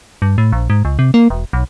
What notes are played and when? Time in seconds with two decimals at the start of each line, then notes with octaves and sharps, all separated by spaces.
0.22 G2
0.38 A2
0.52 A#1
0.70 G#2
0.85 C#2
0.99 C3
1.14 A#3
1.30 E1
1.53 B1